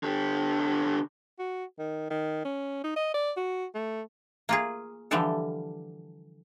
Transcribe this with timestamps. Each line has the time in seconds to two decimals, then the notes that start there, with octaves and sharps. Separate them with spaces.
0.03 D3 G4
1.39 F#4
1.79 D#3
2.11 D#3
2.45 C#4
2.84 D#4
2.96 D#5
3.14 D5
3.37 F#4
3.75 A3
4.49 A#3 F4 G#4
5.11 D3 E3 F3 G3 G4 A4